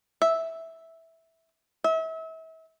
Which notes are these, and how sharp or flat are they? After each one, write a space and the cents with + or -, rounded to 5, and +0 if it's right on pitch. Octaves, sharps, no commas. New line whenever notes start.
E5 -10
E5 -35